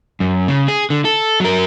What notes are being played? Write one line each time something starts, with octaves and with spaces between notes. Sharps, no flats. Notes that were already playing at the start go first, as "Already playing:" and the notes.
F#2
C#3
G#4
D3
A4
F#3 A#4